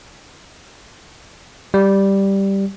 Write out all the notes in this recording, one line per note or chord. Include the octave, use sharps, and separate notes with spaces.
G3